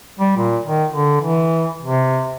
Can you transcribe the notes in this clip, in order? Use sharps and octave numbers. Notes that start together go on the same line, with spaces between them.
G3
A#2
D#3
D3
E3
C3